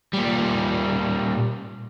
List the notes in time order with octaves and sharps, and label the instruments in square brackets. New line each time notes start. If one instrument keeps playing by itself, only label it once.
[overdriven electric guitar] A#2 G3